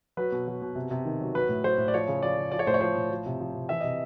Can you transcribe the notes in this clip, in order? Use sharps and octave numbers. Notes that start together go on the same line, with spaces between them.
F#3 B4
B2
F#3
B2
C3
C3
D#3
F#3
F#3 B4
A2
F#3 C5
A2
D5
F3 C#5
C#3
F3 D5
C#3
F3 D5
C#5
A2 C5
C#5
F3 C5
A2
F3
C3
F3
C3
E3 E5
C3 D#5